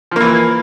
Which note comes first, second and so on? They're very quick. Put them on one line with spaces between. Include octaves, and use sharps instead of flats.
F3 A#3 E3